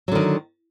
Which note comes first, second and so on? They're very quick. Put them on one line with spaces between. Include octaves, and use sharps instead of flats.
F#3 D3 D#3